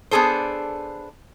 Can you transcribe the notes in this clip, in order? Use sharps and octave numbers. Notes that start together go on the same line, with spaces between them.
B3 D4 G#4 A4 C5